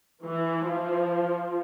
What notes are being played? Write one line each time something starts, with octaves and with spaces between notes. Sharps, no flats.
E3
F3